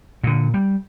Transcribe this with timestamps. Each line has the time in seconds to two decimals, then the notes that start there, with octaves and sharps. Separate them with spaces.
0.24 A#2 D3
0.54 G3